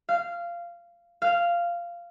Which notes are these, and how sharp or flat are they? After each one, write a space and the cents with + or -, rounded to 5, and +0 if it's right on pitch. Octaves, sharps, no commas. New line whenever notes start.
F5 -15
F5 -10